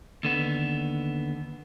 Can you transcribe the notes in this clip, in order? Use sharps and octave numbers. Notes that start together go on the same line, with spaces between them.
D#2 D3 B3